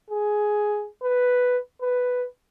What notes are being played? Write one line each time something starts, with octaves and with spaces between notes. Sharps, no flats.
G#4
B4
B4